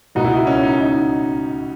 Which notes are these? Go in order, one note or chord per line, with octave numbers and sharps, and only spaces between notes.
C#2 B2 A#3 D#4 F#4
E4
D#4
C#4
D#4
D#4